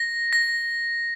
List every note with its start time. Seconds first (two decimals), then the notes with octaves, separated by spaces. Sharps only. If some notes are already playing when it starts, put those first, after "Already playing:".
Already playing: A#6
0.33 A#6